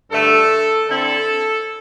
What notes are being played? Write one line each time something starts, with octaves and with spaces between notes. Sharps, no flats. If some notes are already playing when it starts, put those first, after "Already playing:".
G2 D3 A3 A4
D3 C4 E4 A4